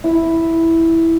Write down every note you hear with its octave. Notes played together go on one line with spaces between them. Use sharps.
E4